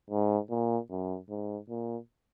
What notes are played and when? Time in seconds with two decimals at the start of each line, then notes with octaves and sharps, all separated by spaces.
0.10 G#2
0.50 A#2
0.90 F#2
1.30 G#2
1.69 A#2